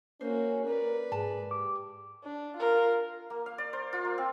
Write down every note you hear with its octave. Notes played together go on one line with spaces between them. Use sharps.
A#3 C#4 F#4 C5
A#4 B4 D5
G#2 G#4 A5
G4 D6
D4
F4 A#4
A#3
F5
D5
C5
F4
A#3
C4